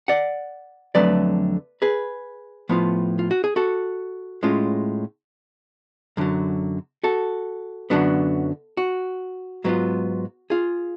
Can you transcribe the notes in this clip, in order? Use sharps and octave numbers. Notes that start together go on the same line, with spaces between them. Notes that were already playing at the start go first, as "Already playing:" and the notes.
D5 F#5
F2 D3 F#3 A3 B4 D5
G#4 B4
A2 F3 B3 F4
F4
F#4
G#4
F#4 A4
A2 G#3 C#4 F4
F#2 D3 F#3
F#4 A4
F#2 D3 F#3 B3 D4
F#4
G#2 F#3 B3 F4
F4 G#4